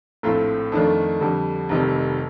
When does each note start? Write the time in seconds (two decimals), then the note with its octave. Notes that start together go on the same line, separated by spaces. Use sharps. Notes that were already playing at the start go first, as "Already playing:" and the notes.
0.23 A#1 A2 A3 C4 F4
0.72 F2 D#3 A3 D4 F4
1.21 F2 D3 G3
1.69 F1 F2 C3 D#3 G3